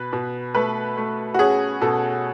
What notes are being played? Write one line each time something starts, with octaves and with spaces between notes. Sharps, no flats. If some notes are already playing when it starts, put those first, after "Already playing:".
Already playing: B2 B4
B2
A3 B4
A3
F#4
C#4 G#4
B2 A4